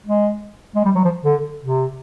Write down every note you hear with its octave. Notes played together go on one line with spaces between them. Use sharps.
G#3
G#3
G3
F#3
F3
D3
C3